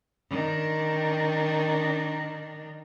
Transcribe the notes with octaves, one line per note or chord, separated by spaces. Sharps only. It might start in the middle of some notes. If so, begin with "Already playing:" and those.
D#3 D4